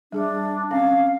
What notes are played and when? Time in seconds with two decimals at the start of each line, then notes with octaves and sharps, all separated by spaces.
0.12 G3 D4 G#4 E5
0.71 C4 C#4 F5